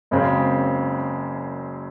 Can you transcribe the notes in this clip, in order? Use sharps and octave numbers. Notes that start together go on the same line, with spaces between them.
F#1 F#2 C#3 G#3 C4